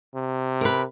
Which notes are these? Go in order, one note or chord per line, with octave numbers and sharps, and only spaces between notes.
C3
A#4 B4